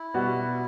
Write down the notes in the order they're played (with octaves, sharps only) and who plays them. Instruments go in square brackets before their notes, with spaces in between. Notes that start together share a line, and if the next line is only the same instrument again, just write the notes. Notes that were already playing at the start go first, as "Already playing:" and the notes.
Already playing: [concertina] E4
[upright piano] B2 G3 B3 F#4